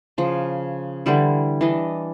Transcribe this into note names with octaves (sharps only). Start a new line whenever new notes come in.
C#3 F3
D3 E3 G3 E4
E3 D4 D#5